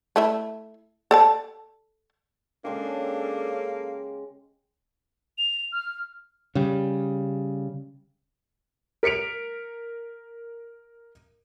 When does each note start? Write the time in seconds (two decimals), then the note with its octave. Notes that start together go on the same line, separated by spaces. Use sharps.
0.16 A3 E4 E5
1.11 A4 D5 A5
2.65 C#3 G#3 A#3 C#4 D4 G4 A4
5.38 F7
5.72 F6
6.55 C#3 G3
9.03 A#4 B6 C#7 D7 F7